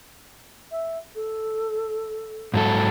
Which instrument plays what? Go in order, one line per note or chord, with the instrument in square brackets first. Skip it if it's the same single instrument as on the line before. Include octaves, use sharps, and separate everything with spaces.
[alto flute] E5
A4
[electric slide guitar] G#2 F#3 A4